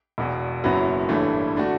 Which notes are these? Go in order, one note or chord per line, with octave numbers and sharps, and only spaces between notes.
E1 E2 B2
F#1 F#2 F#3 B3 E4
A1 G2 E3 A3 E4
D3 A3 D4 F#4